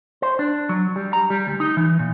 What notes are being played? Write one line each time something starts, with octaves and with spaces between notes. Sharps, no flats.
C5
D4
F#3
G3
A#5
G3
D2
D#4
E3
A#2